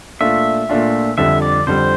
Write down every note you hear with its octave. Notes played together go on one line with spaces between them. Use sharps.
A#2 A3 D4 F4 E5
A#2 A3 D4 F4
F2 D3 G3 E5
D5
F2 D3 G3 C5